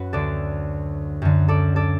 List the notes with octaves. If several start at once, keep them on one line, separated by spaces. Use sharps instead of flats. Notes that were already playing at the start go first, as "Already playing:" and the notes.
Already playing: F#2 F#4 B4
D2 D3 A4 D5
F#2 D3
A4 D5
A4 D5